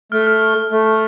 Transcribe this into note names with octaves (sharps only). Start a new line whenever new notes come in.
A3 F6
F6
F6
F6
A3 F6
F6